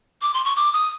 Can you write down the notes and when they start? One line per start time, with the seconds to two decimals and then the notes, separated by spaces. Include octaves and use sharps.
0.22 D6
0.34 C6
0.45 C#6
0.56 D6
0.73 D#6